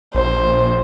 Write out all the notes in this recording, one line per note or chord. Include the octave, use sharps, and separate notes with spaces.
A#1 C5